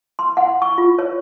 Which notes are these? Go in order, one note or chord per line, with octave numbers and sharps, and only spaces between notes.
C6
F#5
C#6
F4
C#5